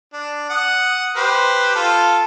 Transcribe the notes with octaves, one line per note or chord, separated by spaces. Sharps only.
D4
F#5 D#6
G4 B4 C5
F4 A4